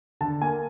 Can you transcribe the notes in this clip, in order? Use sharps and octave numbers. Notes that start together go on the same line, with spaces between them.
D3 A5
A#3 G#5